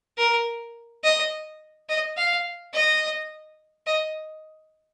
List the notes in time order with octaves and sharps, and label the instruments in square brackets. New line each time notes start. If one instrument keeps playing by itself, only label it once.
[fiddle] A#4
D#5
D#5
F5
D#5
D#5